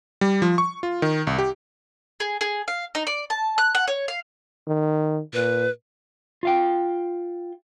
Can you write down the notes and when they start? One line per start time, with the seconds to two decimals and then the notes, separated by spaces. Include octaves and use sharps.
0.21 G3
0.42 F3
0.58 C#6
0.83 F4
1.02 D#3
1.27 C2
1.38 G4
2.20 G#4
2.41 G#4
2.68 F5
2.95 D#4
3.07 D5
3.30 A5
3.58 F#6
3.75 F#5
3.88 C#5
4.08 F5
4.68 D#3
5.34 A#2 B4
6.43 F4 F5 G5